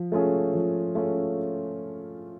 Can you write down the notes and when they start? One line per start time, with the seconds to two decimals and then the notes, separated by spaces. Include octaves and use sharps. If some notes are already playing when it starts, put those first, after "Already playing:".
Already playing: F3
0.12 A3 C#4 F4 G#4
0.54 F3
0.95 A3 C#4 F4 G#4